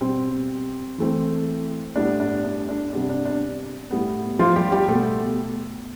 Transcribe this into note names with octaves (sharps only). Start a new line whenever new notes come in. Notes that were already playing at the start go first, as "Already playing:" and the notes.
B2 G3 C4
E3 A3 C4
A2 G3 B3 D4
D4
D4
D4
C3 G3 B3 D4
D4
D4
A2 G3 B3
F3 F4
G3 G4
G3 G4
B2 A3 B3 A4